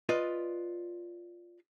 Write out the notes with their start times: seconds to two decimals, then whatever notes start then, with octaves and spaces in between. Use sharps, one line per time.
0.09 F4 B4 D5 D#5